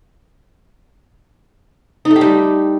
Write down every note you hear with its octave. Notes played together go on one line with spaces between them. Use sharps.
D#4
A3
G4
G3